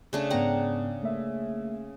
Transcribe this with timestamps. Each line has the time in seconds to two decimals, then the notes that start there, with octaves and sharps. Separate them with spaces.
0.13 C#3 A3 D4
0.30 G#2 B3 F#5 G5 A#5
1.02 A3 A#3 E5